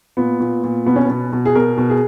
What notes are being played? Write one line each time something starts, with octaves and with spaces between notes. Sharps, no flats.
A#2 B3
A#2
A#2
B2 B3
C#4
B2 B3
B2
G#4
B2 A#4
B2
G#4